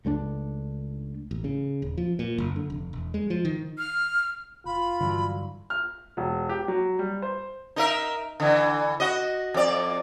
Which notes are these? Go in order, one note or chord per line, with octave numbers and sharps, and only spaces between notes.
C#2 A3 C4 D4
A1
C#3
D#1
F3
A#2
F#1
D3
F1
E1
G#3
F3
D#3
F6
F1 F4 B5
G2 D3 E3 F#3
F6
E1
G4
F#3
G3
C5
D#4 A#4 E5
D3 E3
F#4 D#5
F2 D5